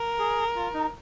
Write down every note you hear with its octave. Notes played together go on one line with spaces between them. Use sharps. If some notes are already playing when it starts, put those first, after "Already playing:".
Already playing: A#4
G#4
F4
D#4